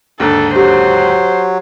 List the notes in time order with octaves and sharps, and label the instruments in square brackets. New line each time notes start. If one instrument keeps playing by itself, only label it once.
[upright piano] D#2 G#2 D3 [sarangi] A4
[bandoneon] F#3 [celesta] G4 [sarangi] C5